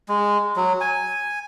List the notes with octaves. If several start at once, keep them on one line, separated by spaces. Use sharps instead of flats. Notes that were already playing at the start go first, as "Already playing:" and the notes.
G#3
F#3
G#5